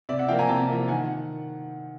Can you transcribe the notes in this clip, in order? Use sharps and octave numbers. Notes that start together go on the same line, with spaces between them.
C3 D5 E5
E5 F#5
F3 A#3 F5 G5
G#5 A#5
C3 G5 A5
F3 A#3
D#3 F#5 G#5